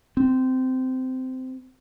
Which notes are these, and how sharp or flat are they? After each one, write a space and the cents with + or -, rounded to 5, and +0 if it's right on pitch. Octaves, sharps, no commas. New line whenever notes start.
C4 -15